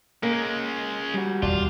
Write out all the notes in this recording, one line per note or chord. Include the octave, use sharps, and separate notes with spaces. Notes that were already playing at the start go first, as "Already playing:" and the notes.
G#3 A#3 C#4
G3 F#4
E1 D#2 D4 F4